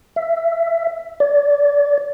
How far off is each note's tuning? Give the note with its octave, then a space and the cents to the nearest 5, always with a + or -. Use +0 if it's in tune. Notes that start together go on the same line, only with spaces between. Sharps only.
E5 +15
D5 -30